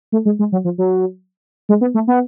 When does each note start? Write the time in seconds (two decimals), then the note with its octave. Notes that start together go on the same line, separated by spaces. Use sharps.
0.12 A3
0.25 G#3
0.39 G#3
0.52 F#3
0.64 F3
0.78 F#3
1.69 G#3
1.81 B3
1.94 A3
2.08 B3